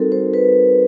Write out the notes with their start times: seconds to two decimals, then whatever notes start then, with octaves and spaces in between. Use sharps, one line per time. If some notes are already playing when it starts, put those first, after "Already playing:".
Already playing: G3 C4 D#4 F#4 A4 A#4
0.12 C5
0.34 B4